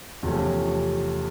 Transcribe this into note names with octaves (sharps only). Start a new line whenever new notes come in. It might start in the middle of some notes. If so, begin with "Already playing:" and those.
E2 C3 F3 A3 C#4